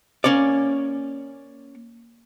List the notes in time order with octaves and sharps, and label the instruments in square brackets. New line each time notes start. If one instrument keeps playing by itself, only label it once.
[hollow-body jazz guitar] A#3 C#4 C#5 D5